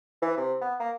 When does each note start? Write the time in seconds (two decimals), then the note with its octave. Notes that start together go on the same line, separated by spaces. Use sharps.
0.22 E3
0.37 C3
0.61 B3
0.80 A#3